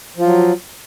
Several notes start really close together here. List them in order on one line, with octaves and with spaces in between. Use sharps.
F3 F4 F#3